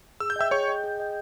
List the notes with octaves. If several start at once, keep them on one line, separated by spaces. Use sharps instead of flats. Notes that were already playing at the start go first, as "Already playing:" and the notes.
G#4 E6
G6
D#5 E5 G5 E6
G#4 C#5 C#6
D#5 G5
G#4
D#5 G5